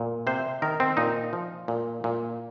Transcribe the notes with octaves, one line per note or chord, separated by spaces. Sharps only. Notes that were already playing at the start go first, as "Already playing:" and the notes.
Already playing: A#2
C3 C5
D#3 A#4
C4
A#2 D#4
F3
A#2
A#2